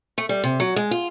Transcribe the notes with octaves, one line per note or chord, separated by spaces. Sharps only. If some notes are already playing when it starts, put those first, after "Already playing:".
A3
G3
C3
F#3
G#3
F4